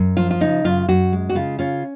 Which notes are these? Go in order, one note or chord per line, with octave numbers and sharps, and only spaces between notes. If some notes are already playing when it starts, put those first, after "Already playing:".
Already playing: F#2
F3 F4
F4
C#3 D#4
F#2 F4
F#2 F#4
G#3
F#4
C#3 F4
C#4 F4